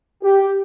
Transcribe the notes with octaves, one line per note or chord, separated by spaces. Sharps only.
G4